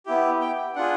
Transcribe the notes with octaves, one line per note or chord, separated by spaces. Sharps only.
B3 E4 G4
G5
D4 F4 G#4 F#5